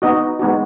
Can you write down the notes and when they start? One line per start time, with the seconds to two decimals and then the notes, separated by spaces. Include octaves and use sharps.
0.02 B3 D#4 F#4 D#5
0.39 G#3 B3 D#4 F#4